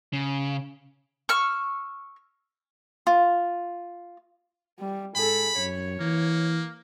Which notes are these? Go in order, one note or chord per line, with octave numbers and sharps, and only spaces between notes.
C#3
C#6 E6 F6
F4
G3
G#2 G#4 A4 B5
F#2 C#5
E3 A#3